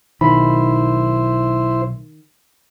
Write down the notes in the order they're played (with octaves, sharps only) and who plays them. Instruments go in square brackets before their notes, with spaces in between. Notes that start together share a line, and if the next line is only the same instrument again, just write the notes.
[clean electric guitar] B1 B5 [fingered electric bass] D#3 [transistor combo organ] E4 C5